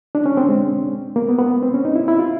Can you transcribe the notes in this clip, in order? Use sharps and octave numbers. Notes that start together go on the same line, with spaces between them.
D4
C#4
C4
G#3
A#3
B3
B3
C4
C#4
D#4
E4
E4
F4